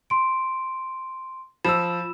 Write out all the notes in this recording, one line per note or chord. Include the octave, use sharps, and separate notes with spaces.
C6 D7
F3 F4 B5 E6 E7